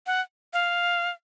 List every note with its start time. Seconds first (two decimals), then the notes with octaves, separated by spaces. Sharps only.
0.07 F#5
0.53 F5